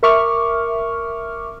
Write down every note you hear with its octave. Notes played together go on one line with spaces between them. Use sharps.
A#4 E5 C#6 D6 F6